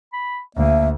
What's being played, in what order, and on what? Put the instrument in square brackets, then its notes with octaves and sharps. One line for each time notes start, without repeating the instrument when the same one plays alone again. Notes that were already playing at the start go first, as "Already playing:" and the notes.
[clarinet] B5
[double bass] D2 [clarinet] A#3 [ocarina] E5